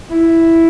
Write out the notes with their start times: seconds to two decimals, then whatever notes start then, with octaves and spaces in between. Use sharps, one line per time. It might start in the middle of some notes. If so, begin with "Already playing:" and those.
0.11 E4